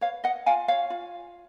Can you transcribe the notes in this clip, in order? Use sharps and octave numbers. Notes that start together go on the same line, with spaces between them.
B4 C#5 F5
D#5 F#5
F4 F5 G#5
C#5 F5
F4